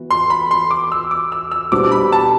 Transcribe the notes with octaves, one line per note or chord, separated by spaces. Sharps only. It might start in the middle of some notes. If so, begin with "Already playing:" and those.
Already playing: E3 B3 F#4
C6
B5
C6
D6
E6
D6
E6
E6
B2 G3 D4 F#4 C5 D6
B5
A5